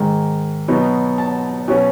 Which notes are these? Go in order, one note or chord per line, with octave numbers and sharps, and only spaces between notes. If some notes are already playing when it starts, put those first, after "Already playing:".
Already playing: G#2 D#3 G#3
B2 F#3 B3 D#4
A5
B2 F#3 C#4